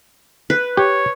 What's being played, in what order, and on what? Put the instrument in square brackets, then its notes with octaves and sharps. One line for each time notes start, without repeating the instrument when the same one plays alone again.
[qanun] B4
[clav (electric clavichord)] G4 [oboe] C#5